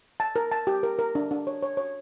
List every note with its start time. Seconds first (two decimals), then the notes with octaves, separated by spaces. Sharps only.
0.20 A5
0.36 A#4
0.51 A5
0.67 G4
0.83 A#4
0.99 A#4
1.15 D4
1.31 D4
1.47 C#5
1.63 C#5
1.77 C#5